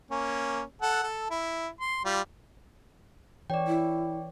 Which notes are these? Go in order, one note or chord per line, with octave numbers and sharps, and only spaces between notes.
A#3 C#4
A4 F#5
A4
E4
C6
G3 F4
E3 C#5 D5 G5
E4